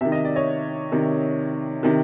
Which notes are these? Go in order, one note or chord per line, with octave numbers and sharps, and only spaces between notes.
C3 D#3 E5
D#5
D5
C#5 D#5
C3 D#3
C3 D#3